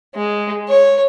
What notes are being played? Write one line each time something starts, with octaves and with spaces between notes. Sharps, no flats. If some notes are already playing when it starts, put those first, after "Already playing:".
G#3
C#5